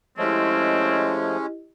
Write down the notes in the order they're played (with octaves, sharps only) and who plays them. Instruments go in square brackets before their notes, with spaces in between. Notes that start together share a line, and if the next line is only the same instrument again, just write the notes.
[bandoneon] F3 A3 [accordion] G#3 C#4 [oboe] C4 [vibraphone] E4 G4 D#5